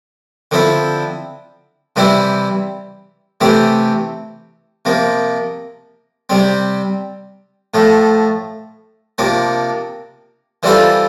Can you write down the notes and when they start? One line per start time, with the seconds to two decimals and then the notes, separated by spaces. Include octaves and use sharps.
0.51 D3 F3 C4 E4
1.96 C3 E3 G3 C4 E4
3.41 C3 E3 A3 C4 G4
4.85 C3 F3 A#3
6.30 C3 G3 C4
7.74 A2 F3 A3
9.18 C3 F3 A#3 D4
10.63 E3 G3 C4 F4 A4